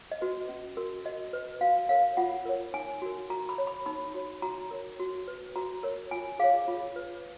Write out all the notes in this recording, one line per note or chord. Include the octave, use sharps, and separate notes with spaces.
D#5
F#4 B4
C#4
F#4 A#4
F#4 D#5
B4
F#4 F5
A#4 C#5 F5
F4 F#5
A#4 C#5
D#4 G#5
F#4 A#4
F#4 A#5
B5
C#5
B5
D#4 B5
F#4 C#5
F#4 A#5
A#4 C#5
F#4
B4
F#4 A#5
A#4 C#5
F4 G#5
G#4 C#5 F5
F4
B4